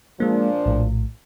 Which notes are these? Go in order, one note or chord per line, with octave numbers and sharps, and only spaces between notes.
A#2 F3 G#3 A#3 D4
A#1 A2